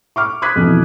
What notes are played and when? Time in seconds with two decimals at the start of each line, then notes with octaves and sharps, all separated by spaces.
0.16 C#6 D6 F6
0.42 D6 D#6 F#6 G#6 B6
0.56 F2 B2 E3